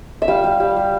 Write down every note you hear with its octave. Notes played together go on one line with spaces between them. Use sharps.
E5
G3 F5
G3
G3
G3